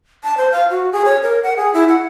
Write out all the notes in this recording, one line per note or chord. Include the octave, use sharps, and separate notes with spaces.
A5
C5
F5
F#4
G#4
C#5
A#4
F#5
G#4
E4
F#5